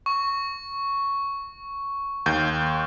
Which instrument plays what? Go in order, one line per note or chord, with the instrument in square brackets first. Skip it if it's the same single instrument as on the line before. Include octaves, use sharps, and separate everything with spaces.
[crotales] C#6
[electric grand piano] D#2 G6